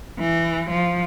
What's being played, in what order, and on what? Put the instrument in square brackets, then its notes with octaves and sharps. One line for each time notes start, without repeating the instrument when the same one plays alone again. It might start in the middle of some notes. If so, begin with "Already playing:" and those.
[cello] E3
F3